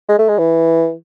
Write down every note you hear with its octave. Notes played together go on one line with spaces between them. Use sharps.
G#3
A3
G#3
E3